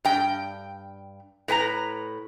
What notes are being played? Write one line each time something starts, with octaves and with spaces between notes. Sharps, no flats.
G2 G5
A2 B4 G#5 A#5